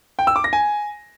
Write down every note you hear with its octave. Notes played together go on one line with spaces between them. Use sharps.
G5
E6
D6
A#6
G#5